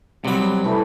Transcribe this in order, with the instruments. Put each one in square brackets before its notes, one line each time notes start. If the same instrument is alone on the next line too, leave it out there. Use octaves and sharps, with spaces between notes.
[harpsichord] C2 B5 [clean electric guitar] C3 F#3
[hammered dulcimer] E3 A3